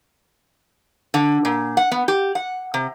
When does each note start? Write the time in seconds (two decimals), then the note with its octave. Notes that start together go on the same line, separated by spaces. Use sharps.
1.14 D3
1.45 A#2
1.77 F#5
1.92 B3
2.08 G4
2.35 F#5
2.74 C3